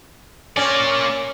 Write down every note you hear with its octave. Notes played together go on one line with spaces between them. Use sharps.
A#3 C#4 D5